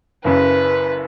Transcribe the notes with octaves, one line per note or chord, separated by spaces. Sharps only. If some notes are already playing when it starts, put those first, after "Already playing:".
F#1 F#2 C#3 B4